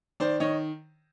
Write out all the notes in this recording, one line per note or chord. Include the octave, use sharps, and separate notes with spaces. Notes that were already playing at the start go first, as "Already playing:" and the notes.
D#3 C5 D5
D#3 C#5 D#5